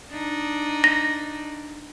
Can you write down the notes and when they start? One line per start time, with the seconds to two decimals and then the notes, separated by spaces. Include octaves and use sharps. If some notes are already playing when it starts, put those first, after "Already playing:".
0.11 D4 D#4
0.84 A#6